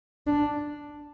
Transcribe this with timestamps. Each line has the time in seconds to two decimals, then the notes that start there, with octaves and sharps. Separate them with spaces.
0.27 D4